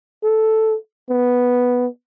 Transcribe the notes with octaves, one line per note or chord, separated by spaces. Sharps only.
A4
B3